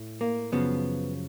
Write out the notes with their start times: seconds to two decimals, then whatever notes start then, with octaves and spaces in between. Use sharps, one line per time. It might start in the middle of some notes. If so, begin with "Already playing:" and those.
Already playing: A2
0.21 A#3
0.52 F#2 C#3 F3 B3